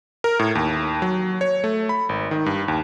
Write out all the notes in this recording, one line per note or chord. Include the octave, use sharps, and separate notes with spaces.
A#4
A2
D#2
F#3
C#5
A3
B5
G#1
D#3
G2
D#2